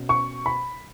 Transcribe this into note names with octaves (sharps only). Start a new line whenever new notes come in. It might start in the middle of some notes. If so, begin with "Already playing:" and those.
Already playing: B2 C#4
C#6
B5